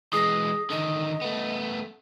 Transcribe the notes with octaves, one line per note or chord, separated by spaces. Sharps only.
E3 G#3 G#4 D#6 A#6
D3 D#3 D#5
A3 B3